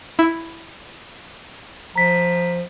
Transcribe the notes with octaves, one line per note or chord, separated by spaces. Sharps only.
E4
F3 A#5 B6